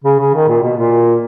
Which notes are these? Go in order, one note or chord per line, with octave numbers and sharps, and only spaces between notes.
C#3
C#3
D#3
A#2
B2
A#2